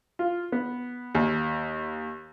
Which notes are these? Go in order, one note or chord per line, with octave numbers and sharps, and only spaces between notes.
F4
B3
D#2